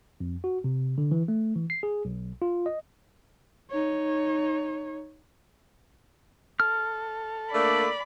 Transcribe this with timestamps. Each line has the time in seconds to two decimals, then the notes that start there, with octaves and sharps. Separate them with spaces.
0.20 F2
0.44 F#4
0.64 C3
0.98 D3
1.11 E3
1.28 A3
1.56 E3
1.70 C7
1.83 G#4
2.05 B1
2.42 F4
2.66 D#5
3.71 D#4 C#5
6.60 A4 F6
7.52 A3 A#3 D4 D5 B5